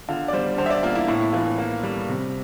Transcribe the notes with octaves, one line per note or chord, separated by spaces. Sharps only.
D3 F4
D5
G3 C5
D3 C5
E5
D5
A#3 F4
E4
A2 E4
E4
E3 F4
A#3
G3
C3